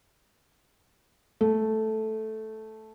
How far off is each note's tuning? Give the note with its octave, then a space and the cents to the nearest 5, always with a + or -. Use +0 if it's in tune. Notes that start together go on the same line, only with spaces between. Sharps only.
A3 -5